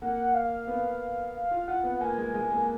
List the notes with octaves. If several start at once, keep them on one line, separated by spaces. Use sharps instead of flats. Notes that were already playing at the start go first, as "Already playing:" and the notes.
A#3 F#5
F5
B3
F5
F4
F4 F#5
B3
F#5
A#3 G#5
G#3
G#3
A#3